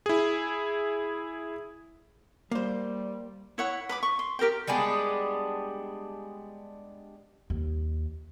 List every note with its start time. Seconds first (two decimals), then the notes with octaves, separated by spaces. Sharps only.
0.06 E4 G#4
2.51 G3 A#3 C5
3.58 E4 C#5 F#5 B5
3.89 B4 B5 D6
4.03 C#6
4.19 C6
4.39 G4 A#4 C5 G5
4.67 G3 G#3 B3 D4
7.50 D#2